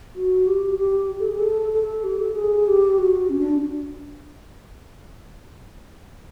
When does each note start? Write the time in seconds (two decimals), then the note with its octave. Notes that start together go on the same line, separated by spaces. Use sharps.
0.16 F#4
0.47 G4
0.78 G4
1.19 A4
1.29 G#4
1.38 A4
1.73 A4
2.03 G4
2.19 A4
2.35 G#4
2.67 G4
2.98 F#4
3.30 C#4
3.39 D4